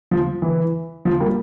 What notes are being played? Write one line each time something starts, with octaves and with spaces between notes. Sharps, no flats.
F3
E3
F3
G3 A#3